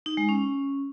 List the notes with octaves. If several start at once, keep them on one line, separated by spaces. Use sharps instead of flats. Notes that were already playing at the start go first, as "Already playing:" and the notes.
D#4
G#3
C#4